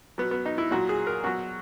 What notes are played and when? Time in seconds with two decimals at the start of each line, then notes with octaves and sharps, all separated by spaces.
0.18 B2 F#3 B3
0.31 B3
0.46 D#4
0.58 E4
0.71 A#2 F#3 F#4
0.89 G#4
1.07 A#4
1.24 B2 F#3 F#4